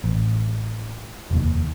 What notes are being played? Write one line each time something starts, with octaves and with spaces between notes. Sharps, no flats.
A1
F1 D#2